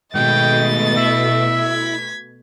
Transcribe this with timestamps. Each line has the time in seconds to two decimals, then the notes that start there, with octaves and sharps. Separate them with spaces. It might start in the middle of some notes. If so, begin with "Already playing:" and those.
0.15 B2 D#3 G#3 A3 D#5 G5 A6
0.97 E4 E5
1.56 G#6 B6